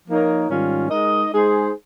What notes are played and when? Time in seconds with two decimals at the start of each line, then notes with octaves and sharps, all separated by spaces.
0.08 F3 A#3 D#4 A#4 C#5
0.49 G#2 D#3 G3 C#4 F4
0.89 G#3 D#4 A#4 D#5
1.30 G#3 D#4 G#4 C5